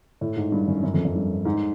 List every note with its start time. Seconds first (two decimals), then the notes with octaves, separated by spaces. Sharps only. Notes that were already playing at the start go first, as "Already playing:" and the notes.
0.21 A2
0.37 G#2
0.52 G2
0.67 F#2
0.83 F#2
0.94 F2
1.05 F#2
1.15 G2
1.45 G#2